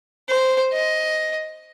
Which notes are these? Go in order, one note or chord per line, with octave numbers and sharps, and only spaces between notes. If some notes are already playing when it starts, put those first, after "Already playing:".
C5
D#5